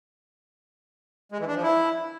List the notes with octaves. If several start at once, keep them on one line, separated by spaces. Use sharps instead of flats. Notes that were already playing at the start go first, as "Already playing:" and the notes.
G#3
E3
D4
F3
E4